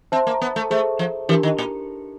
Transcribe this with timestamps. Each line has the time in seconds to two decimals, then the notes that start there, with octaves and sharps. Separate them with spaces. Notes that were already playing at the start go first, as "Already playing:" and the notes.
0.12 C4 C5 E5 A5
0.27 A#3
0.42 B3
0.56 A3
0.70 A3 G#4 C5 E5
0.99 F3
1.29 E3 D4 G4 A#4
1.43 D#3
1.58 A#2